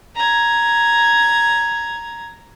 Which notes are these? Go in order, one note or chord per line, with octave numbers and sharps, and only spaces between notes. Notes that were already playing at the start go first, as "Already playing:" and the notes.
A#5 G#6